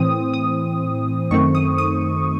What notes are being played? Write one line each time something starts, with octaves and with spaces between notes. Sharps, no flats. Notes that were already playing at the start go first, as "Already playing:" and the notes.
Already playing: A2 E3 C4 D#6
D#6
F#2 D#3 A3 C4 C#6
D#6
D#6